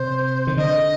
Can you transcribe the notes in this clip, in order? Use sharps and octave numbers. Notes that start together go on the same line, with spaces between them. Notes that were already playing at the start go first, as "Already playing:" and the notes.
Already playing: C3 C5
D#3
D3 D#5